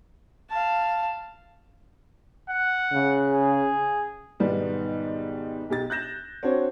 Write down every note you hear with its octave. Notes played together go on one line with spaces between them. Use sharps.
F5 A5
F#5
C#3
G#4
G#2 B2 D#3 G3 B3 D#4
B1 G4 A6
F#6 G6 A#6 E7
C4 D4 F#4 C#5